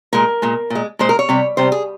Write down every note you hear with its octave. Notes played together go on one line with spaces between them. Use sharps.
A#2 G#3 A#4
A#2 G#3
A#2 G#3
A#2 G#3 C5
A#4
C#5
C3 G3
C3 G3 C5
G#4